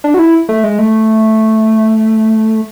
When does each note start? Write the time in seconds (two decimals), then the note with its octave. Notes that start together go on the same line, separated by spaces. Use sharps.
0.04 D4
0.14 F#4
0.19 E4
0.49 A3
0.64 G#3
0.79 A3